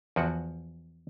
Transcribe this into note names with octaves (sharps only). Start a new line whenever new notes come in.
E2 F3 F#4 F#5